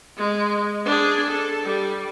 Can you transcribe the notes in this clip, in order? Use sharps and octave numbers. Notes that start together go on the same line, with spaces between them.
G#3
D4 G#4
A4
G3